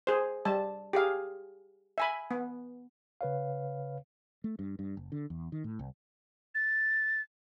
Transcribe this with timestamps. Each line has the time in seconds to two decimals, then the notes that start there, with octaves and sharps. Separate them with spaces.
0.07 G#4 C5
0.45 G3 A5
0.93 G4 G#4 F5
1.98 E5 G#5 B5
2.31 B3
3.21 C#3 B4 C#5 F5
4.44 A3
4.59 G2
4.79 G2
4.97 F#1
5.12 D3
5.30 E2
5.52 D#3
5.64 A2
5.79 C2
6.55 A6